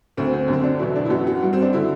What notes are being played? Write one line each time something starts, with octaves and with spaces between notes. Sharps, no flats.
D2 D3 F#3 C4
C4
F#2 D3 F#3 C4
D4
E2 B2 F#3 E4
D4
E4
F#2 F#3 F#4
F#4
G2 F#3
C4
D4
D3 F#3 E4